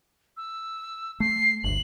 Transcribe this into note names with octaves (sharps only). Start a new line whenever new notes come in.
E6
A3 C7
G1 D2 F#7